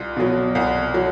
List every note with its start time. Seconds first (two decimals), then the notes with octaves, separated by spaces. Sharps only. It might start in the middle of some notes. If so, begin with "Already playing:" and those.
Already playing: C2 F4
0.17 B2 F#3
0.55 C2
0.94 F#3